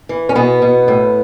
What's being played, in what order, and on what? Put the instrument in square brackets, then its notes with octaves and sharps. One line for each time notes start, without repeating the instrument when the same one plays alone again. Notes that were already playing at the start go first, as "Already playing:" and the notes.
[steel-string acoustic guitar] E3
C#4
B2 B3
B2
A2